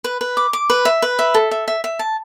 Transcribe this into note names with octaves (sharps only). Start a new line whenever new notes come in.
B4
B4
D6
D6
B4
E5
B4
E5
A4
E5
E5
E5
A5